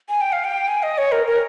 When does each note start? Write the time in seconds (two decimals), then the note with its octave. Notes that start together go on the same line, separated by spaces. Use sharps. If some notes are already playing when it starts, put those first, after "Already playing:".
0.09 G#5
0.21 G5
0.32 F5
0.44 G5
0.68 G#5
0.83 D#5
0.98 C#5
1.12 A#4
1.27 A#4